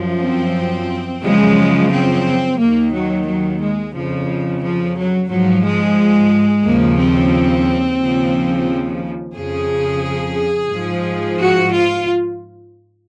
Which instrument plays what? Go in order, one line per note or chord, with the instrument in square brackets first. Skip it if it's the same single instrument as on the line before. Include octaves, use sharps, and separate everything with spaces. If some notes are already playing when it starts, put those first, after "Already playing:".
Already playing: [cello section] F#2 F3
C4
F#2 C#3 F3 G#3
C4
D#2 D#3 A#3
F#3
F#3
G#3
F2 C#3 F3
F3
F#3
G#2 F3 F#3
G#3
D#2 C#3 F3 A#3
C4
D#2 C#3 F3
F2 C#3 F3 G#4
G#2 F3
F#4
F4